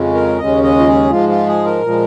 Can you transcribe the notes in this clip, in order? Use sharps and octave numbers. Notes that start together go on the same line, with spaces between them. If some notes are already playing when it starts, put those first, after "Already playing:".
Already playing: F2 C#3 G#3 C#4
A#4
D#2 C#3 G#3 C#4 D#5
D#5
F4
G#4
G#2 F3 G#3 F4
F4
G#4
A#4
A#2 F3 G#3